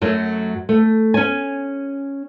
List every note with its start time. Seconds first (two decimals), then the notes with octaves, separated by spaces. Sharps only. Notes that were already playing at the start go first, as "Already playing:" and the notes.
0.01 F#2 F#3 A3
0.69 A3
1.14 C#4 G#5